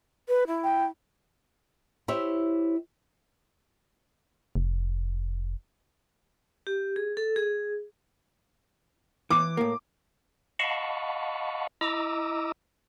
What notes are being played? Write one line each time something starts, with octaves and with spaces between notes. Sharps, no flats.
B4
E4
G5
E4 G4 C5 C#5 E5
F1
G4
G#4
A4
G#4
E3 D6
A2 A#3
D#5 F5 F#5 A5 B5 C#6
E4 D#5 A#5 D6 E6